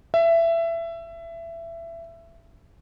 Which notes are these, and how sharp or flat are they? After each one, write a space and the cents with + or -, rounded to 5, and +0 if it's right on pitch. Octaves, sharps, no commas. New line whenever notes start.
E5 +20